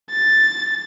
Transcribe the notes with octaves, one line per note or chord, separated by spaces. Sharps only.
A6